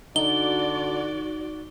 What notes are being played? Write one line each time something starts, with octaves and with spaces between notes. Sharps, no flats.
D3 D#4 F#4 D5 G7